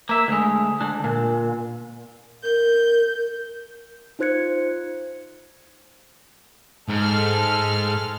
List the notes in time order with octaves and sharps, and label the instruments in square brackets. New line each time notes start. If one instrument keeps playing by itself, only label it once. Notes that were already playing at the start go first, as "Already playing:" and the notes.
[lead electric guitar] A#3 E5
D2 G#3
D3 D4
A#2
[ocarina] A#4 [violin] G6
[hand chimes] D#4 F4 C5 F#6 G#6 C#7
[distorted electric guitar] G#2 [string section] G#3 A4 F6